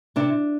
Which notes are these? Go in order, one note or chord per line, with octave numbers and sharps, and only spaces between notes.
C3 D4